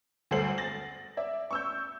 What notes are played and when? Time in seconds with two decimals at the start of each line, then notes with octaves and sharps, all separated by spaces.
0.31 D2 G2 A4 C5 C7 F#7
0.58 A6 A#6 F#7
1.17 D5 E5
1.51 C#6 E6 G6